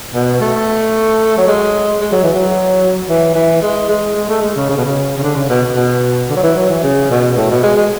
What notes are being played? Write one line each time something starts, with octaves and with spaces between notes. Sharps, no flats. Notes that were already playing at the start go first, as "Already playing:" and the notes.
B2
A3
F#3
G#3
G#3
F#3
E3
F#3
E3
E3
G#3
G#3
G#3
A3
G#3
C#3
C#3
B2
C#3
C#3
D3
C#3
B2
B2
D3
F#3
E3
F#3
E3
C#3
B2
A2
B2
G#3
G#3